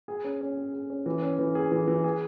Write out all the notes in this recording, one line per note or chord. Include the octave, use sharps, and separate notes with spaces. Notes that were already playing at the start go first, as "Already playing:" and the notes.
G#4
C#4
C#4
G#4
G#4
C#4
E3
C#4
E3
G#4
E3
E3
G#4